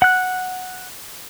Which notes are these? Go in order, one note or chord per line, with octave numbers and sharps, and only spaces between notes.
F#5 F#6